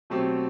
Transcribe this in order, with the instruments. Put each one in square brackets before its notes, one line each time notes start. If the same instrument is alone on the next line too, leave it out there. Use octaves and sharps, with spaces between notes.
[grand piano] B2 F#3 A3 C4 G4